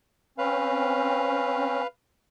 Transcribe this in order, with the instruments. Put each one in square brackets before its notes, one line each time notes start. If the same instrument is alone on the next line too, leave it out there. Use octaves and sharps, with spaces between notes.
[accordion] C4 C#4 [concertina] B4 F5